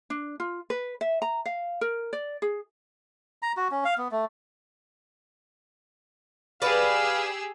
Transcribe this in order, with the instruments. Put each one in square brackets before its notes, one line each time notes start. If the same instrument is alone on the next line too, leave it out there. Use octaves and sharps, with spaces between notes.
[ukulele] D4
F4
B4
E5
A#5
F5
A#4
D5
G#4
[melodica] A#5
F#4
C#4
F5
B3
A3
[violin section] G4 G#4 E6 [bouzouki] B4 D5 [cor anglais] F5